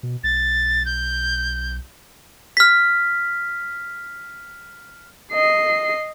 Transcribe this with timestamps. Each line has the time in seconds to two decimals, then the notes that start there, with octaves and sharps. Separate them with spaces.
0.03 B2
0.24 B1 A6
0.85 G6
2.57 F6 B6
5.32 D#5 C7